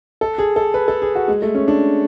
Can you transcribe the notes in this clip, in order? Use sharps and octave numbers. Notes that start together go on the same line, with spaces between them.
A4
G#4
A4
B4
A4
G#4
F#4
G#3
A3
C#4
D4